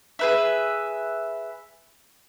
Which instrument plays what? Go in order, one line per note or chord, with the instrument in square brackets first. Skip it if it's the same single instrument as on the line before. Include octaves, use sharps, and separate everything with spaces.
[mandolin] G#4 B4 E5